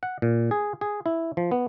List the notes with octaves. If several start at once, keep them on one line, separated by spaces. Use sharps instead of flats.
F#5
A#2
G#4
G#4
E4
F3
B3